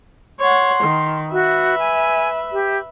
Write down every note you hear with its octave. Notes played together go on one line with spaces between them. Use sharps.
C#5 F#5 C6
D#3
F#4 B4 E5
G#5
G4